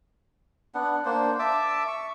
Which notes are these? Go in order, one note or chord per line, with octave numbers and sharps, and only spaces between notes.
B3 D4 F#5
A#3 D4 C5
E5 A5 D6 E6
C#6